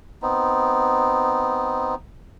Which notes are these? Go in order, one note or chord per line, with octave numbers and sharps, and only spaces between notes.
B3 C4 D#4